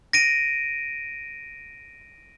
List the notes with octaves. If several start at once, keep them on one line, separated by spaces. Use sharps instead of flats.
A#6 D7 D#7